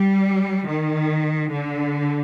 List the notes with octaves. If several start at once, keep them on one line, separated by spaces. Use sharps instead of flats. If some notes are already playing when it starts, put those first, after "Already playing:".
Already playing: G3
D#3
D3